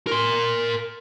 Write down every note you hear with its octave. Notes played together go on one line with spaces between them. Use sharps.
A#4 C6